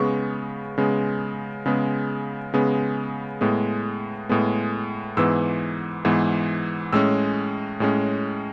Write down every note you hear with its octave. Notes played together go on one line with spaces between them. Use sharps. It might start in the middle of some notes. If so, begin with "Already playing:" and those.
Already playing: C#3 G#3 B3 C#6
C#3 G#3 B3
C#3 G#3 B3
C#3 G#3 B3
A2 G#3 B3
A2 G#3 B3
G#2 E3 B3 E6
G#2 E3 B3
A2 G#3 C#4 E6
A2 G#3 C#4